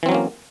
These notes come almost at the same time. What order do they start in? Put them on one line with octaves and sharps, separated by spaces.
E3 C4 F#3 C#4 A#3